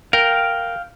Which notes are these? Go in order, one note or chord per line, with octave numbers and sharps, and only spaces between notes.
A#4 F5 G5